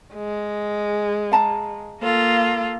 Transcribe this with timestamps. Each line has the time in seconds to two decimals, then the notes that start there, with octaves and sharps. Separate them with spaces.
0.14 G#3
1.32 F5 A5 A#5
2.03 A#3 F4 A4